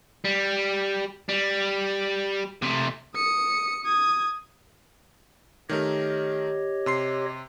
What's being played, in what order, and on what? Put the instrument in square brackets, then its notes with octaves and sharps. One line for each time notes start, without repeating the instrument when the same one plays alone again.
[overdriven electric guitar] G3
G3
C3 A3
[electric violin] D#6 C#7
D#6 G#6
[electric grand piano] D#3 A3 A#4 [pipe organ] G4 C#5 D#5
[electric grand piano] C3 C6 C7